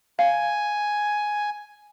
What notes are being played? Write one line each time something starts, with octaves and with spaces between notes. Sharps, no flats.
F5 G#5